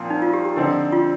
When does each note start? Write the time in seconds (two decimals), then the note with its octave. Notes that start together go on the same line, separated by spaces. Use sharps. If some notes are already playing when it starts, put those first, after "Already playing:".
Already playing: A#2 F3 C4 A#4
0.10 D#4
0.22 F4
0.33 G4
0.45 G4
0.56 D3 F3 C4 D#4
0.92 F4